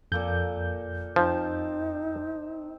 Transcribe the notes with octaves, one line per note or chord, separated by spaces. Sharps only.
F2 A#2 A#3 A4 G6
F3 C4 D#4 A5